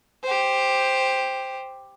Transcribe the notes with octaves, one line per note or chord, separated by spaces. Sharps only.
G4 C5